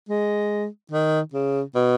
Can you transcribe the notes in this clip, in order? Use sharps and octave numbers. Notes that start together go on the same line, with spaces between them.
G#3
D#3
C#3
B2